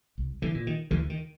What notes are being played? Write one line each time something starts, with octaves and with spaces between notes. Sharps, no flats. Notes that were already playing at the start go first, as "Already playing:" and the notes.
C2
D3 E3
A#2
D#3
D2 D3 E3
D#3